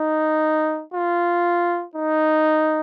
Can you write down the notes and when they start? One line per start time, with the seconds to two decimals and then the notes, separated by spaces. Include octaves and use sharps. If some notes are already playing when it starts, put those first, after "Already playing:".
Already playing: D#4
0.94 F4
1.96 D#4